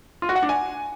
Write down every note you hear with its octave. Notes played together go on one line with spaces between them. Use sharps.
F4
F#4
F#5
D4
G#5